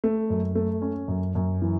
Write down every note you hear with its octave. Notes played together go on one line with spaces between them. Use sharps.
A3
F#2
A3
C#4
F#2
F#2
E3